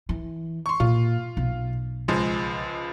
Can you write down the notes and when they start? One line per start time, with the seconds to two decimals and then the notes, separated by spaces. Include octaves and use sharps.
0.09 E3
0.66 C6 C#6
0.80 A#2 F4
1.37 B1
2.08 C#2 F3 G#3